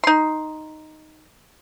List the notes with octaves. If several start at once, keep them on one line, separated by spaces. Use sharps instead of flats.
D#4 C6